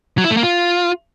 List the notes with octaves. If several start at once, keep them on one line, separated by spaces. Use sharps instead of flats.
F#3
E4
A3
A#3
F4